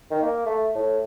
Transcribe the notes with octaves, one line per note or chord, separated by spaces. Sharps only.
D#3
A#3
A3
A2